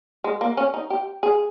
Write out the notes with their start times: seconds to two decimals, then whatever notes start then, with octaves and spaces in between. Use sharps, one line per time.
0.24 G#3
0.41 A#3
0.57 C#4
0.74 D#4
0.90 G4
1.23 G#4